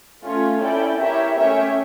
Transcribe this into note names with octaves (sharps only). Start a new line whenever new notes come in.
A3 C#4 F4 C#5
C#4 E4 A4 D5 G5
E4 G4 A#4 C#5 E5
A3 C#4 G4 C#5 E5